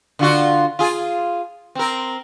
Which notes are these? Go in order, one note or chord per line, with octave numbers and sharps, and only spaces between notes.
D3 F4 F#4
F4 G#4
C4 A#4